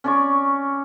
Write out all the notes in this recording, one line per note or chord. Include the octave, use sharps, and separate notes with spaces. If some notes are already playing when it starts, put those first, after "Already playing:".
C#4 D5 C#6